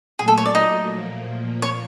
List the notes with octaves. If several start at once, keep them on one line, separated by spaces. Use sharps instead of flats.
A#2 F#3 A3 G#4
A4
C#5
D5
D#4 D#5
A#2 F3 A#3
C#5